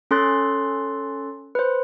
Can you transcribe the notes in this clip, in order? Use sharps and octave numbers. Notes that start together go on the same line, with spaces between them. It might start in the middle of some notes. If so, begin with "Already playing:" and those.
C#4 A4 C6 F#6 A6
B4 C5